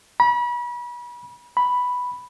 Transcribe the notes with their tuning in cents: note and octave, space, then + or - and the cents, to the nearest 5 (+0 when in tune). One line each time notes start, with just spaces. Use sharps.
B5 -35
B5 +0